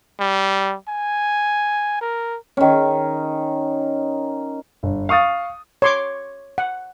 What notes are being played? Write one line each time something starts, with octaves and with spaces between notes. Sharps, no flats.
G3
G#5
A#4
D#3 C#4
G1
F5 C#6 D#6 A6
C#5 C6 D6
F#5